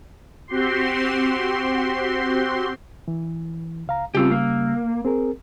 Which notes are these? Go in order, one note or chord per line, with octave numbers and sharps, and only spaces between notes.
C4 F#4 G4 C6
E3
C#2 F5 A#5
C#3 G3 C4 F4 G4 E6
A#3
C4 G#4 A#4